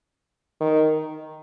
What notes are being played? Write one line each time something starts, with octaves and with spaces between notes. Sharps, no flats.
D#3